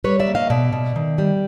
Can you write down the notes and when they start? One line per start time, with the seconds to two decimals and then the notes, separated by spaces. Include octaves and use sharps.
0.04 G3 B4 C#5
0.19 D5 E5
0.27 A#3
0.35 D#5 F5
0.50 B2 D5 E5
0.72 B2
0.96 D#3
1.18 G3